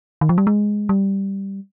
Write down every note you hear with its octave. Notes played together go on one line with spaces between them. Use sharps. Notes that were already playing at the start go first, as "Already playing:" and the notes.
D#3
F3
G3
G#3
G3